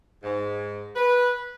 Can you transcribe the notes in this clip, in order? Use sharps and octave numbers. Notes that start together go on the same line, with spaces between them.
G#2
B4